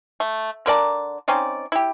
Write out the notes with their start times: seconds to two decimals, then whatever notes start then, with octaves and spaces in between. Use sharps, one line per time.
0.20 A3
0.66 D3 A#4 D5 A5
1.28 C4 C#4 D#4 D5
1.72 E4 G4